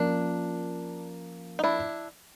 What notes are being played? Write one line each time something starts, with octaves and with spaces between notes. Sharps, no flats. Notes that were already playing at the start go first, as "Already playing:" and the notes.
Already playing: F3 A#3 C#4 D4 F4 A#4
D#4
D4 E4